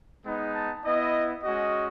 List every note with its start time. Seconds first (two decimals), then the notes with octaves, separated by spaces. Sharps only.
0.24 G#3 B3 D#4
0.53 A5
0.83 B3 E4 D#5
1.43 G#3 C#4 F#4 D#5